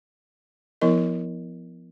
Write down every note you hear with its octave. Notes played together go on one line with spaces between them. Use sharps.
F3 B3 E4 A#4 D#5